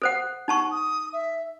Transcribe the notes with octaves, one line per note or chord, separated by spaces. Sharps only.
A4 C5 F#5
D#4 F#5 A5 C#6
D#6
E5